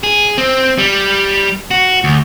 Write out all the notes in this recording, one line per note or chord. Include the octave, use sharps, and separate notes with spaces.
G#4
C4
G3
F#4
D2